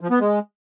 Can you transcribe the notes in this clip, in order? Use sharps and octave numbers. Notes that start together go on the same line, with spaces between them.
F3
B3
G#3